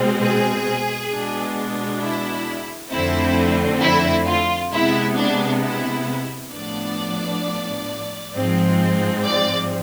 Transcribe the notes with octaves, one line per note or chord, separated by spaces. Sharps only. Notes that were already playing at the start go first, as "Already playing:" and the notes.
Already playing: B2 G#3 C4
G#4
B2 G#3 B3 D4
E4
F2 D3 A3 C4 E4
E4
F4
C3 G#3 B3 E4
D4
E4
A2 F3 B3 D4 D5
G#2 F3 G#3 C4
D5